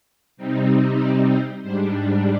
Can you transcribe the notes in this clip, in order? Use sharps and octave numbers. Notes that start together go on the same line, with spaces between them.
C3 G3 C4 D#4
D5
C5
G#2 G3 D4 C5